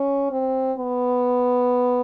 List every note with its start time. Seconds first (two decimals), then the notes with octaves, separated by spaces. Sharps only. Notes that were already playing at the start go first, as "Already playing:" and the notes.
Already playing: C#4
0.31 C4
0.78 B3